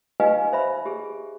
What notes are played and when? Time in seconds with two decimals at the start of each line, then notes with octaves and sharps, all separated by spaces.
0.20 D#4 G4 B4 D#5 F5 G#5
0.53 C5 E5 B5
0.86 G4 G#4